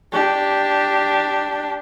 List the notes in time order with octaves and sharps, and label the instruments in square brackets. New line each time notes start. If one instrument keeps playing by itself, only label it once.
[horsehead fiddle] D4 G4